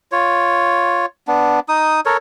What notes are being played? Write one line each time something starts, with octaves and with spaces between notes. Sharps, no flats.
F4 C#5
B3 D4
D#4 D#6
A4 A#4 C#5